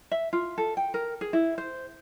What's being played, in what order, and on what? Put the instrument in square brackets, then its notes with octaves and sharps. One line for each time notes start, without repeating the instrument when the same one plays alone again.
[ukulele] E5
F4
A4
G5
A#4
G#4
E4
C5